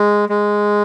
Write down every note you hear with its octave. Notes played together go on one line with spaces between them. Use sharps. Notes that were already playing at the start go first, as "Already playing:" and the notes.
Already playing: G#3
G#3